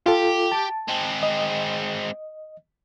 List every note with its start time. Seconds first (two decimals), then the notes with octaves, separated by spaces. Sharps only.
0.06 F4 G4 A4
0.52 A5
0.88 G#3 C4
1.23 D#5